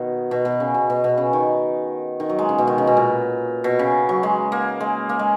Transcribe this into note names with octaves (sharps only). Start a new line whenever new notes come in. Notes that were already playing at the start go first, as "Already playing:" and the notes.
Already playing: B2 D#3
B2
B2
C#3
B2
B2
B2
C#3
D#3
D#3
F#3
G#3
C#3
B2
D#3
C#3
B2
A#2
B2
C#3
F#3
G#3
A#3
G#3
A#3
G#3